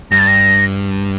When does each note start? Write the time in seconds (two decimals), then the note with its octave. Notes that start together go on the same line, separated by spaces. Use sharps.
0.11 G2 A#6
0.19 A6
0.28 A#6